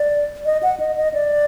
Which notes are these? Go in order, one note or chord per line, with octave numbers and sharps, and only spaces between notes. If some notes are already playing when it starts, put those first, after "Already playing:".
Already playing: D5
D#5
F#5
D#5
D#5
D5